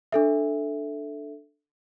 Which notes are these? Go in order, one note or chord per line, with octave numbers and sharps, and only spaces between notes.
D4 A4 E5